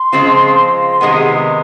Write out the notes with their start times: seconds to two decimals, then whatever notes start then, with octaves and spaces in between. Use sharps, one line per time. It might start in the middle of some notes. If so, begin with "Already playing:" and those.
Already playing: C6
0.12 C#3 F3 G#3 C4 F4
1.01 C3 D#3 G#3 B3